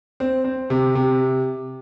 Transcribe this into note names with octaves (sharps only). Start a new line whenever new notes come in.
C4
C4
C3
C3